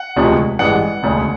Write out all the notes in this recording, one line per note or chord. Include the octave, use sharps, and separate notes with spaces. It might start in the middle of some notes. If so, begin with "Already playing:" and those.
Already playing: F#5
E1 D2 C3 F3 G#3
A1 G2 E3 G#3 F#5
E1 D2 C#3